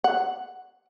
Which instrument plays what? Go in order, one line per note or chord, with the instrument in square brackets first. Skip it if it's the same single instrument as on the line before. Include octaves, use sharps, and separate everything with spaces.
[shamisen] F#5